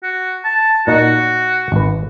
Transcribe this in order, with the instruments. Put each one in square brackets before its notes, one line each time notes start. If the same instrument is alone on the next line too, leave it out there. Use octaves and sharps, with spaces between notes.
[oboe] F#4
A5
[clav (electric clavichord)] A#2 D#4 [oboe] F#4
[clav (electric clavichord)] G#1 B4